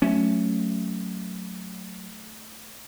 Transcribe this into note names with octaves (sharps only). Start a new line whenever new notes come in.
F#3 A3 C#4 E5